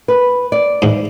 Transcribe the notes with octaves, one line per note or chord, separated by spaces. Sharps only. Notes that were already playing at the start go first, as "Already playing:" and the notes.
B4
D5
G#2 E3